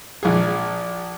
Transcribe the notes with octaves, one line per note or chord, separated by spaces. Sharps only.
A#1 G#4